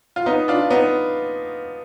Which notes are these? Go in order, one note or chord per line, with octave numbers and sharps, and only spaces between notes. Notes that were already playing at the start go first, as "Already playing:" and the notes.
F4
B3 D#4
D4 F4
B3 D#4